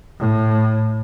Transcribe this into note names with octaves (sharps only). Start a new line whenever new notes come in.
A2